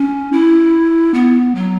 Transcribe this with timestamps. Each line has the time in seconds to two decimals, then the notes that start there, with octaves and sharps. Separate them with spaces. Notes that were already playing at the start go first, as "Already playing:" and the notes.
Already playing: C#4
0.32 E4
1.14 B3
1.55 F#3